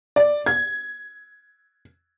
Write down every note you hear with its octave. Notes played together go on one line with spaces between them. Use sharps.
D5
G#6